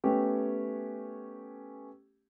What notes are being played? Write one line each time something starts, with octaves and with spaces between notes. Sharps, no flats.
A3 B3 C#4 G4